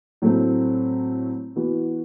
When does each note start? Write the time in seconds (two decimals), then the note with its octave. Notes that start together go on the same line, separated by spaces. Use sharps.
0.22 A2 F#3 A3 C4
1.56 E3 B3 F#4